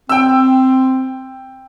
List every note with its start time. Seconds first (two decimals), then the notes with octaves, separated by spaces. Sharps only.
0.09 C4 G5 E6